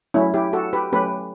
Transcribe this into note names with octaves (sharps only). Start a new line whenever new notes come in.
F#3 A3 C#4 E4
E4 G4
F#4 A4
G4 B4
F#3 A3 C#4 G4 B4